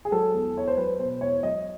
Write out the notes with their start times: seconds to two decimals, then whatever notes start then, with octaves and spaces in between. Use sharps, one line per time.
0.05 G#4
0.12 F#3 A4
0.34 E2
0.56 E2 C#5
0.67 C5
0.77 F#3 B4
0.99 B2 C5
1.21 E2 C#5
1.43 F#3 D#5